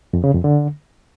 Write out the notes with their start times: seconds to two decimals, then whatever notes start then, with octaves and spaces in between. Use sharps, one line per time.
0.13 F2
0.24 C#3
0.34 F2
0.44 D3